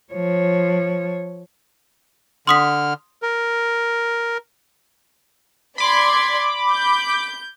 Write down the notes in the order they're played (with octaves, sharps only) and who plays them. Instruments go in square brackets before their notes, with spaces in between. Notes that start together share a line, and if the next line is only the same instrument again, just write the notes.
[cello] F3 C#5
[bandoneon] D3 F6 [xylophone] C6 D#6 B6
[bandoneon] A#4
[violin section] D5 C6 G#6 [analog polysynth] B5 D6
[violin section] G6